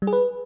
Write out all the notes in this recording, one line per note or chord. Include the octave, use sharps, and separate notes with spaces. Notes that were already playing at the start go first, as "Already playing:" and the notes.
G3
G#4
B4